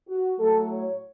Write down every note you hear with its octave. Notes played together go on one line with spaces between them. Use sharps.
F#4
A2 F#3 A3 A4
C#5